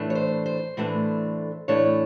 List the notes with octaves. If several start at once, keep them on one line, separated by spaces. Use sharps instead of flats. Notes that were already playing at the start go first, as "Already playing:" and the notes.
Already playing: A2 E3 A3 D4
C#5
C5
C5
A2 E3 A3 D4
A2 E3 A3 D4 C#5